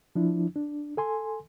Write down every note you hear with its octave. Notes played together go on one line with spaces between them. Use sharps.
F3 D4 E4
D4
A4 G#5 C6